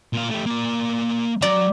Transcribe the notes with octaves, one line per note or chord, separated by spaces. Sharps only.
A#2 F5
A3 G4
A#3 D5
F#3 D5 A#5